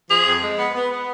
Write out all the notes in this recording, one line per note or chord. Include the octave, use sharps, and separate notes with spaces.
F3 G#4
F2
G#3
B3
B3
B3